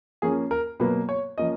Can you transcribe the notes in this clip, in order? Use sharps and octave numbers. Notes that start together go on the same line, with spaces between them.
F3 A#3 C#4 G#4
A#4
B2 F#3 A#3 B4
C#5
F3 A#3 C#4 D#5